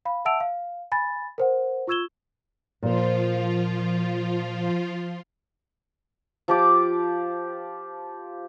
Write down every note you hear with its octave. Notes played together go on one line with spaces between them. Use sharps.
F5 B5
E5 F#5 A5 E6 D7 F7
F5
G#5 B5 A6
A#4 C5 F#5
F4 C#6 E6 G#6 E7 G7
A#2 F3 F4 C5
F3 G4 D6